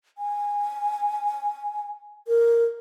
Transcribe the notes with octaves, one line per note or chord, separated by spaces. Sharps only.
G#5
A#4